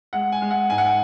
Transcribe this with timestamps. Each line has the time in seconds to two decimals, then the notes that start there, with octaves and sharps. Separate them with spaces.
0.13 G#3 F#5
0.32 G#5
0.42 G#3
0.51 F#5
0.70 G#2 G#5
0.78 F#5
0.86 G#5